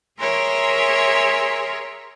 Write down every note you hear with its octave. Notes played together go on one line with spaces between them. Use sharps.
G#4 A#4 C#5 E5 C6